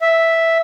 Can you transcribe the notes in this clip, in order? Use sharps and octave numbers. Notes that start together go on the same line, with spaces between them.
E5